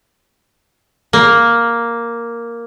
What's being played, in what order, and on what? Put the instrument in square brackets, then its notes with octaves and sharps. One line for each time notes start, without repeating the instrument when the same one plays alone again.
[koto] A#3